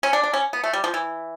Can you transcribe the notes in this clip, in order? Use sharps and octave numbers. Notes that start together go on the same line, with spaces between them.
C#4
D4
D4
C#4
B3
A3
G3
F3
E3